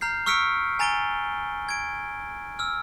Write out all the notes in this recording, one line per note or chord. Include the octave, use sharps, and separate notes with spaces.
A#5 F6 G6 C7
C#6 E6 F6 B6 C#7 D7
G#5 A#5 A6 D7 D#7 G7
G#6 D7
E6 F6